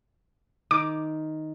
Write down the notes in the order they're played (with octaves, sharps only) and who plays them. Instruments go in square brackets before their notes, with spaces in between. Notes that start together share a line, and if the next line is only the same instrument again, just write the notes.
[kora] D#3 [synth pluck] D6